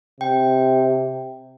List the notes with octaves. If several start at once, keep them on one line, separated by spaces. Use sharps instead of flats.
C3 G5